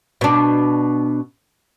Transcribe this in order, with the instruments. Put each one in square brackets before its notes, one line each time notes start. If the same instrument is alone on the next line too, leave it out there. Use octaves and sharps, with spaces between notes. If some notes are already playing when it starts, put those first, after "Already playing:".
[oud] B2 D4